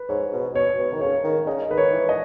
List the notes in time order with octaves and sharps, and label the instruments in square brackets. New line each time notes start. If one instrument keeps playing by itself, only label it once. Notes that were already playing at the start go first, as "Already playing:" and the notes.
Already playing: [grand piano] B4
[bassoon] G#2 [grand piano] C#5
[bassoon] B2
[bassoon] B2 [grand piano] C#5
[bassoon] B2
D#3
[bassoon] C#3 [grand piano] C#5
[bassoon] D#3
[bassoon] C#3 [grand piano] D#5
[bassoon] D#3 [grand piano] B4
[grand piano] C#5
[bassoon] E3
[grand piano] D#5